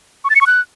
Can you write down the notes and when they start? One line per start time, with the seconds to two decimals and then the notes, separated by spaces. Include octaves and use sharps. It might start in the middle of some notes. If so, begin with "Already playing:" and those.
0.24 C#6
0.30 A6
0.35 C#7
0.41 C#6
0.47 F#6